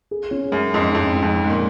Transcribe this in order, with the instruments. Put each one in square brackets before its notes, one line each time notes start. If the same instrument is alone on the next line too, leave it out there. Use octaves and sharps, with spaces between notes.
[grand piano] G#4
C#4
[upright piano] F#2 [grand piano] G#3
[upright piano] F2 G#2 [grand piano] C#4
[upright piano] F2 G#2 [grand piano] C#4
[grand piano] C#4
[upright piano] F2 G#2
[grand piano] G#3
[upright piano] G#2
A#2